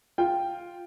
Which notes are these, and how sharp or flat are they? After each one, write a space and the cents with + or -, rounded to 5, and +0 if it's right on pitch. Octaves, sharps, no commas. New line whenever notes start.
F4 +0 G5 +0